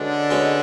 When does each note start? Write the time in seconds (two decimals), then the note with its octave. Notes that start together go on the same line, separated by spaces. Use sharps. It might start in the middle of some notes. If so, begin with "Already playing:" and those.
Already playing: B2 D3 G#3 C#4 D4
0.31 B2 G#3 C#4